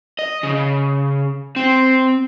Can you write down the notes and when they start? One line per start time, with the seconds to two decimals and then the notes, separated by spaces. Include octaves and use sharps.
0.19 D#5
0.43 C#3
1.56 C4